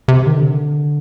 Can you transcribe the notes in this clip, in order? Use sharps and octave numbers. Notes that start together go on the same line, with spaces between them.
C3
D#3
D3